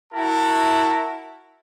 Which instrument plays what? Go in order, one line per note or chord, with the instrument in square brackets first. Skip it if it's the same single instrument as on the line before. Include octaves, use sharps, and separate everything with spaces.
[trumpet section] E4 F#4 A#4 A5